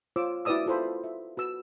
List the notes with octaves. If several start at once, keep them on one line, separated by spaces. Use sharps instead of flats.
F4 C5 C#5 D6 E6
E4 F#4 B4 D5 D#6 E6
F4 A4 C5 B5
E5
F#4 B4 E6